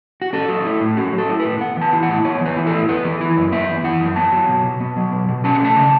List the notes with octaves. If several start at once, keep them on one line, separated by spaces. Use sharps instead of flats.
F#4
C#4 A4
F#3
E4
A2
C#4 F#4
F#3
A4
E4
B4
A2
B3 F#5
E3 A5
E4
F#5
A2
B3 C#5
E3 B4
E4
A4
A2
B3 B4
E3
E4
F#2
B3 E5
E3
E4 F#5
F#2
B3 A5
F#3
B2
B2
B3
F#3
B2
B2
C#4 A5
F#5
A3 A5
C#3